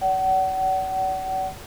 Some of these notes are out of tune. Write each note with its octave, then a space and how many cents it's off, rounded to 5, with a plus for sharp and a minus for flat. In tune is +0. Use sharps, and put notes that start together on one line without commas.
D5 -40 F#5 +35